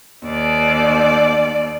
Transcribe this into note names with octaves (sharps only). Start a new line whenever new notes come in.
D#2 D5